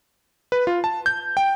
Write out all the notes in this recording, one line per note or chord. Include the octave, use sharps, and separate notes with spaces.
B4
F4
A5
G6
G5